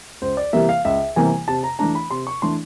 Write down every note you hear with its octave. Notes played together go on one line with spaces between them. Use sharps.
C#2 C5
D5
C3 E3 G3 A#3 E5
F5
C#2 E5
C3 E3 G3 A#3 G#5
C3 A5
A#5
E3 A3 D4 A#5
B5
C3 C6
C#6
E3 A3 D4 C6